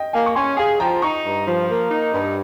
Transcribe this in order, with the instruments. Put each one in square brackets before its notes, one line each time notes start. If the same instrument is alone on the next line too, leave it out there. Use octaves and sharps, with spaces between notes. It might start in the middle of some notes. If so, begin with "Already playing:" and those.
Already playing: [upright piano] D#5 G5
[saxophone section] A#3 [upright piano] F5 G#5
[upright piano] C#6
[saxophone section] C#4 [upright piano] G#5 C6
[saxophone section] G#4 [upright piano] F5 G#5
[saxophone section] F3 [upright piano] G5 A#5
[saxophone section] D#4 [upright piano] A#5 C#6
[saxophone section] G2
F3
A#3
D#4
G2